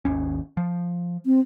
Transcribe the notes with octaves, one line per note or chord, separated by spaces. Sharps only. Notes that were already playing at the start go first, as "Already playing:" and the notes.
G#1 D#2 C#4
F3
C4